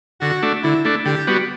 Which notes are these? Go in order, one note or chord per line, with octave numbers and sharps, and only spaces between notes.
D3 F#4
A3 D4
D3 E4
A3 D4
D3 G4
G3 B3 F#4